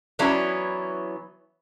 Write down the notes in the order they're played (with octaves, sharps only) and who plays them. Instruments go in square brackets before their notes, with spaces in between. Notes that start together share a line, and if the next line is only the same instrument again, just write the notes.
[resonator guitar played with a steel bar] E3 F#3 B3 C#4 D4 E4